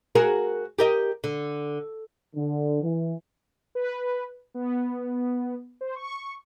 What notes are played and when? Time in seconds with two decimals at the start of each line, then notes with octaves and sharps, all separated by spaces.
0.15 F#4 G#4 A#4
0.79 G4 A#4 D#5
1.24 D3
2.35 D3
2.82 E3
3.75 B4
4.54 B3
5.81 C5
5.96 C#6